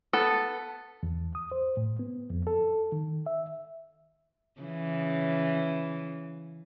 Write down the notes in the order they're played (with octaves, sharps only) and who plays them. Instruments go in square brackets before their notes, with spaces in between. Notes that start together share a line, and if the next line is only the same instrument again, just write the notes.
[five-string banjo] B3 A4
[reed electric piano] E2
D#6
C5
A2
B3
F2
A4
D#3
E5
[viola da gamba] C#3 E3